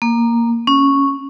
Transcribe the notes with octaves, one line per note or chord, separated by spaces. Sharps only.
A#3
C#4